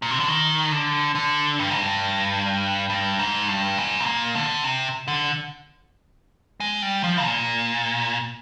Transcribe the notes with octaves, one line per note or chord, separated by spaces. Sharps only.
A#2
C3
D3
D#3
D3
D3
G2
G#2
G2
G2
G#2
G2
G#2
C3
A#2
D3
C3
D3
G#3
G3
F3
A#2